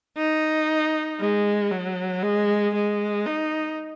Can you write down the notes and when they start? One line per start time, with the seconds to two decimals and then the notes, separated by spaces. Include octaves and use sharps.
0.17 D#4
1.20 G#3
1.71 F#3
2.23 G#3
2.75 G#3
3.26 D#4